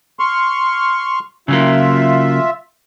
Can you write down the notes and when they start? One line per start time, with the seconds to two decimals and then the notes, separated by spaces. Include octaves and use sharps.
0.19 C6 C#6 F6
1.48 C#3 F#3 A#3 F4 E5